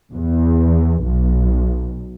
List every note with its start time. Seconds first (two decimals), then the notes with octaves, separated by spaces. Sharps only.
0.13 E2
1.04 B1